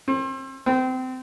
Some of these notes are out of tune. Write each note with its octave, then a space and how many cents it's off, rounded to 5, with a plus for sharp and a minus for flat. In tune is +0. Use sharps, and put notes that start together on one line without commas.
C4 +35
C4 -25